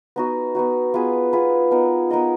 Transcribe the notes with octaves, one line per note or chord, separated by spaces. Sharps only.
B3 D#4 F#4
B3 D#4 F#4
B3 F4 G#4 B4
B3 F4 G#4 B4
B3 D#4 A#4 D#5
B3 D#4 A#4 D#5